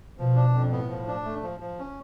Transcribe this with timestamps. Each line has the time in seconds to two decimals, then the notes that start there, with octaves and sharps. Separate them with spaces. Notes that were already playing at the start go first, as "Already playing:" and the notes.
0.18 B2 F3
0.36 D4
0.54 F2
0.72 A2 B3
0.89 F3
1.08 D4
1.25 A3
1.43 F3
1.60 F3
1.79 C#4